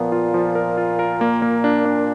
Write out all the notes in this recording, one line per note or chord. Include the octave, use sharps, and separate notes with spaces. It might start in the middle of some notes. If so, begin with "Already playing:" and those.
Already playing: A#2 F3 B3
F4
F3
A#4
F4
A#4
A#3
A#3
D4
D4